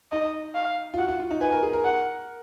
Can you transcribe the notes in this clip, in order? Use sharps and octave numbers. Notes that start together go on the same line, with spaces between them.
D#4 D#5
F5
F4
F#4 F#5
F4
F4
D#4
B4 G#5
A#4
G#4
A#4
F#5